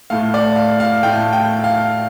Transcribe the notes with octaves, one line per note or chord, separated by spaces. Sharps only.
A2 A3 F5
D5
F5
F5
A2 A3 G5
G5
F5